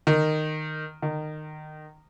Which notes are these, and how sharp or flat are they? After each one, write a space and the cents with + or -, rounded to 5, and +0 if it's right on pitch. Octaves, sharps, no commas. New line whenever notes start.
D#3 -10
D#3 -20